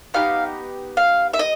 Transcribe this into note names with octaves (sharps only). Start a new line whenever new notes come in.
B3 D#4 G4 F5
F5
E5
D#5